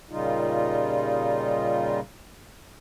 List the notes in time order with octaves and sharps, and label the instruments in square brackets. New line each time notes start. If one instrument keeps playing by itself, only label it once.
[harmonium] A#2 C#3 G3 D#4 F4